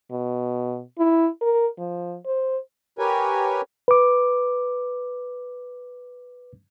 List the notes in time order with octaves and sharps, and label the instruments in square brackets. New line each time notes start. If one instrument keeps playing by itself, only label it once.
[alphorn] B2
E4
A#4
F3
C5
[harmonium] G4 A#4 B4 C#5 G#5
[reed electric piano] B4 D6